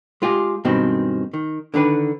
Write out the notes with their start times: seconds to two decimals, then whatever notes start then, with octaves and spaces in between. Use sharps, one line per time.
0.22 G#3 F4 G4 G#4
0.65 G2 B2 D#3 G#3 C4
1.34 D#3
1.74 D3 D#3 D4 B4